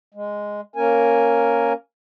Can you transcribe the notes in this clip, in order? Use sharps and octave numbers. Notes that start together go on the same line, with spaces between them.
G#3
A#3 C#4 A#4 G#5